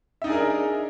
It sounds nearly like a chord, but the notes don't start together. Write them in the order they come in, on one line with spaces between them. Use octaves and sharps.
E5 D#4 D4 G#4 A#4